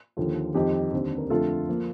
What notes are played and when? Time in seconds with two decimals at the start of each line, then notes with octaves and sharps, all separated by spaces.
0.17 D#2 D3 F3 A#3 F4 A4
0.55 F2 D#3 G3 C4 D#4 G4
0.93 D#2 D3 G3 C4
1.18 A#4
1.30 F2 D3 A3 F4 A4
1.69 F3 A#3